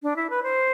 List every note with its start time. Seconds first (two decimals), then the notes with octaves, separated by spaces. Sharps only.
0.03 D4
0.16 E4
0.30 B4
0.43 C5